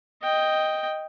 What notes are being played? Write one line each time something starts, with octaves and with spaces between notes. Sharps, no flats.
D#5 G5